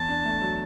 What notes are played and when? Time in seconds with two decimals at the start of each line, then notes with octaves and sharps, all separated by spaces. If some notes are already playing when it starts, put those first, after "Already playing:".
Already playing: E2 A5
0.09 D4
0.25 A3
0.41 F#3